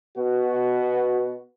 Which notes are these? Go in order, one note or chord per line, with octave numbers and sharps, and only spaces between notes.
B2 B3 F#4